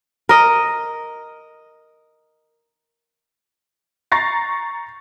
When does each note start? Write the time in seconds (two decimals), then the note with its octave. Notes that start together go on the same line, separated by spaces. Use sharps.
0.29 A#4 D#5
4.12 A#5 C#6 A6 A#6 C7